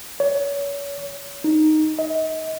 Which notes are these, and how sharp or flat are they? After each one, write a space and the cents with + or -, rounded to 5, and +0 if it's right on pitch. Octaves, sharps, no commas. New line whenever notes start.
C#5 +30
D#4 -5
D#5 +35